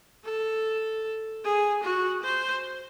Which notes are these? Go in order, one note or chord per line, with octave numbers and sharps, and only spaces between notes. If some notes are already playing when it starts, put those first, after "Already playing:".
A4
G#4
F#4
C5